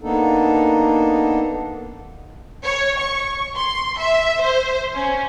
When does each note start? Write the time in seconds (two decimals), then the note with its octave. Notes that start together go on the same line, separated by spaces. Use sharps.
0.01 A#3 B3 D4 D#4 A4
2.65 C#5
2.99 C#6
3.57 C6
3.98 E5
4.41 C5
4.95 C#4